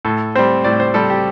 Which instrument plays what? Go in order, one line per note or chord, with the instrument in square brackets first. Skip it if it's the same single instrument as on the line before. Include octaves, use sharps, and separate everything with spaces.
[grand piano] A2 A4
G3 C4 C5
A2 D5
C5
G3 C4 A4
G4